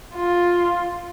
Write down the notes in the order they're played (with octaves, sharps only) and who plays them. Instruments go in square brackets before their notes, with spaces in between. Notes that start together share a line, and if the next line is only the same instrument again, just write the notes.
[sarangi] F4